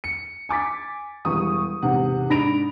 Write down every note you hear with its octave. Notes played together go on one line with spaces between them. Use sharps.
C#7
G#5 D6 A6 B6
E1 G3 C#6 D#6
E1 G#2 C3 F#5
G#2 D4 B5 A#6 D7 F7